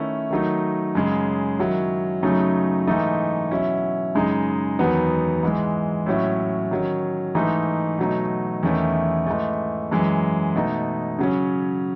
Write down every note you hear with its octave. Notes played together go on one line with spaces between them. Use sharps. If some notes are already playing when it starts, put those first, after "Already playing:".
Already playing: D#3 A3 C#4 E4
D#3 F#3 A3 D#4
F#2 C#3 G#3
D#3 F#3 C#4 E4
F#2 C#3 F#3 A3 D#4
G#2 E3 A3 D#4
B2 F#3 C#4 E4
F#2 C#3 G#3 D#4
E2 D#3 F#3 B3 D#4
G#2 E3 G#3
A2 F#3 C#4 E4
D#3 F#3 C#4
G#2 E3 A3 D#4
B2 F#3 A3 D#4
E2 D#3 A3 C#4 E4
G#2 E3 A3
F#2 E3 G#3
B2 A3 D#4
C#3 F#3 C#4